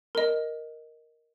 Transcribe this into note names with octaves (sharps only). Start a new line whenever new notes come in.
A#4 D#5